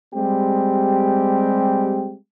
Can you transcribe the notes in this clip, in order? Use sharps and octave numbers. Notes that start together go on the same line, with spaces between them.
G3 G#3 C4 G4